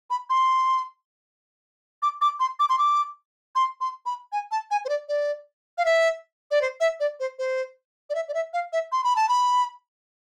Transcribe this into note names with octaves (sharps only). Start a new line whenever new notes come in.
B5
C6
D6
D6
C6
D6
C6
D6
C6
C6
B5
G#5
A5
G#5
C5
D5
D5
F5
E5
D5
C5
E5
D5
C5
C5
D5
E5
D5
E5
F5
E5
C6
B5
A5
B5